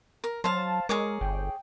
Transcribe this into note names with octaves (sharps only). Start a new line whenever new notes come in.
A#4
F#3 C5 F5 A5
G#3 G#4 A#4 C#5 D6
G1 G5